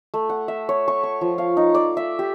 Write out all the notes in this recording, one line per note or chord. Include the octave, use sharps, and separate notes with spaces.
A3
F#5
E5
C#5
C#6
C#6
F3
F5
D#4
D5
E5
G4